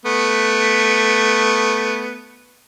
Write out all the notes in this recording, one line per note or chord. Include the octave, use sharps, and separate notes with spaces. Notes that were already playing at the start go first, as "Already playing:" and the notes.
A3 B3